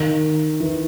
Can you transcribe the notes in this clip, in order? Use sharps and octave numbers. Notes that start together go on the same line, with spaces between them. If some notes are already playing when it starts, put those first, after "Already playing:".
Already playing: D#3
E3